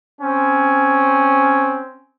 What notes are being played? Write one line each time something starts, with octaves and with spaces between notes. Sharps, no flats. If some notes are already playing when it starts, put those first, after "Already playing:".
C4 C#4